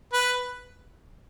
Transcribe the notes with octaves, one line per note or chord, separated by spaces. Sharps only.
B4